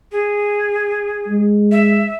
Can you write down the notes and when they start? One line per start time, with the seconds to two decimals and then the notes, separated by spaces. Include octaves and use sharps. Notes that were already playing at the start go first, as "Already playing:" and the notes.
0.12 G#4
1.28 G#3
1.72 E5